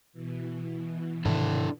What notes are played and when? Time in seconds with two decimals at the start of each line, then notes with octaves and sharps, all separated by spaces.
0.13 B2 E3
1.25 G#2 C3 D#3 D4 E4 A4